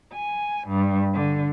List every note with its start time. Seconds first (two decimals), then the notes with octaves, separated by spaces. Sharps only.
0.12 G#5
0.67 G2
1.13 D3